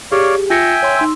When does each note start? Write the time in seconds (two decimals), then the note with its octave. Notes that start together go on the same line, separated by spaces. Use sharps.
0.12 G4 G#4 C#5 D5 F5
0.50 F4 E5 G5 G#5 A#6 C#7
0.83 C#5 C6
0.97 D#4 C6 E6